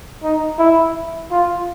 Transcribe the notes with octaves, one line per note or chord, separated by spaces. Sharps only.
D#4
E4
F4